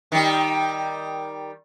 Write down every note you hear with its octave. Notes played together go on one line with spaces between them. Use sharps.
D#3 G3